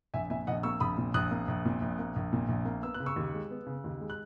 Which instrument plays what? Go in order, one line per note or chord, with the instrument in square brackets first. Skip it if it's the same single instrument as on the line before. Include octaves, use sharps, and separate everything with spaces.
[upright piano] A#1 E5 G#5
A#2 E5 G#5
A#1 D#5 F#5
A#3 C#6 E6
A#1 B5 D#6
A#2
A#1 D#6 F#6
A#3
A#1
A#2
A#1
A#3
A#1
A#2
A#1
A#3
B3 E6
F#6
C#3
C#6 E6
D#2
G#3
B3
C#3
D#2
G#3
F#6